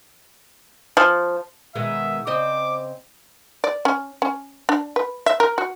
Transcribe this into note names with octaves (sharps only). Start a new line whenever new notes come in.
F3
B2 D#3 G#3 E5
C#3 C4 D#5 D6
D5
C#4
C#4
D4
B4
E5
A#4
F#4